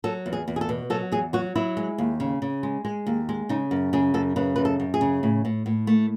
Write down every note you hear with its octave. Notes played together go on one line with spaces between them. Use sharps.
F#3 A4
E2
G#4
E2
G#4
A4
B2
F#3 A4
E2 G#4
F#3 F#4
F#3 E4
G#3
D#2
C#3
C#3
G#3
G#3
D#2
G#3
C#3 D#4
F#2
C#3 G#4
F#2 A4
C#3 B4
F#2 B4
A4
F#2
G#4
C#3
A2
A2
A2
A3